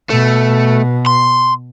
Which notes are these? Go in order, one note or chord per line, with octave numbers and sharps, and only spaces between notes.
B2 A3
C6